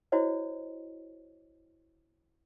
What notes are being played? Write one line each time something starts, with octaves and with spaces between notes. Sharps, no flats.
E4 F#4 C5 C#5 D#5